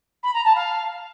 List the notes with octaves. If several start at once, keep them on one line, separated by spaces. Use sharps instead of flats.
B5
A#5
A5
F5